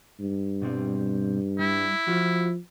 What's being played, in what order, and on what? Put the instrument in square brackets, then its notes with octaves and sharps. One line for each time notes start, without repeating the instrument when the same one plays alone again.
[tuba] G2
[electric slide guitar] B2 G3 C4
[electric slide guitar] G3 [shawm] E4
[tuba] F3 [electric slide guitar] F4 F#4